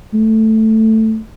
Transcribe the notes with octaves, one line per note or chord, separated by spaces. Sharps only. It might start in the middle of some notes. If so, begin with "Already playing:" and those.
A3